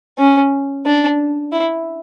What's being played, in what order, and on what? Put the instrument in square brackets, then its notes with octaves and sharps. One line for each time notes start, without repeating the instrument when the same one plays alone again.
[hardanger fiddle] C#4
D4
E4